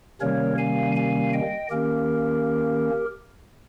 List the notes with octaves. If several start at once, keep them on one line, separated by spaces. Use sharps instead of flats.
C3 D#3 G3 A#3 C#4 A#4 C#5
F5 G#5
F5 G#5
D#5 G5
D#3 A#3 C#4 G4 A#4